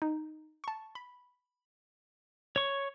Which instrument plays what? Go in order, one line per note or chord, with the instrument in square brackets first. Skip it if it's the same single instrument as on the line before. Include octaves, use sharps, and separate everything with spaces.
[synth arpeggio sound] D#4
A5 C#6
B5
[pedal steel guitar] C#5 C#6